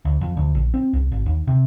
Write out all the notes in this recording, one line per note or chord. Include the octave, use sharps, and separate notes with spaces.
D2
F2
D2
A#1
C4
C2
G#1
D#2
C3